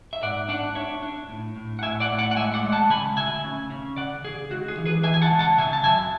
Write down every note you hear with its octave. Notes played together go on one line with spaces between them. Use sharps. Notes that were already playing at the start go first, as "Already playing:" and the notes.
E5
G#2 D5 F#5
D4 D5 F#5
D4 C#5 E5
D4
A2
A2
F#5
A2 E5 G#5
D5 F#5
A2
D5 F#5
F#5
G#3 E5 G#5
D5 F#5
G#3
F#5 A5
C#3 G#5 B5
D2 E5 G#5
C#3
C#3
C#3 D5 F#5
C#3 G#4
C#2 F#4
G#4
E3
G#4 B4
E3 E5 G#5
G#5
F#5 A5
C#2
F#5 A5
C#3 E5 G#5
A5
F#2 E5 G#5